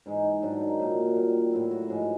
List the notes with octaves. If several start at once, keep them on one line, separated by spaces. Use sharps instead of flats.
G#2 E3 G#3 D#4
D#4
G#2 D#3 F#3 D4
D#4
A#2 F#3
A#2 G3
A2 F#3 E4
F#4
G#2 F3 G#3 F#4